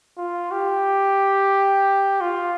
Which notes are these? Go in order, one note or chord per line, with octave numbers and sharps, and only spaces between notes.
F4
G4
F4